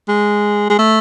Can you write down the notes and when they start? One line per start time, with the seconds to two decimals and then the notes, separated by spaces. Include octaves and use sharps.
0.08 G#3
0.70 G#3
0.79 A3